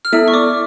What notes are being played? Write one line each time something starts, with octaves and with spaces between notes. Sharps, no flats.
F6
B3 E4 A4 E5 E6
C#6
D5 D6